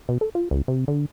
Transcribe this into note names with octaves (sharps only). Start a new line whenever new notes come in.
B2
A4
F4
C#2
C3
D3